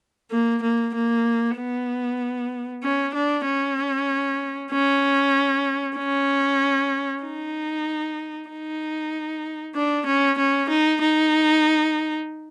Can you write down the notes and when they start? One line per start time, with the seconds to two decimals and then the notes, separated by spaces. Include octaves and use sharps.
0.31 A#3
0.63 A#3
0.94 A#3
1.57 B3
2.83 C#4
3.14 D4
3.45 C#4
4.72 C#4
5.97 C#4
7.23 D#4
8.49 D#4
9.75 D4
10.06 C#4
10.38 C#4
10.69 D#4
11.02 D#4